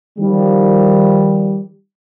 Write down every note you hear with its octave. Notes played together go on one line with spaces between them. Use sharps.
D#3 F3 G3